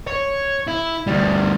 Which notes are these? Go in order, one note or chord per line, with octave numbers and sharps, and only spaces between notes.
C#5
E4
D2 G3